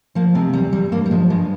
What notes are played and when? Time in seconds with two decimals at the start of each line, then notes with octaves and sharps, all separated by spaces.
0.15 F3 A#3
0.35 C3 G#3
0.53 E2 G3
0.73 E2 G3
0.92 G2 A#3
1.06 G3
1.11 F3 G#3
1.30 G2 G#3